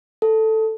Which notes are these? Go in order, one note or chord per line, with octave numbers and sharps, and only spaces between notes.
A4